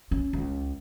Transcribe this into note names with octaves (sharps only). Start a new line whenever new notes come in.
C#4
C#2